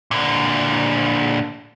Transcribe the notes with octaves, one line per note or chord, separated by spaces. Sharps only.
A#2 D3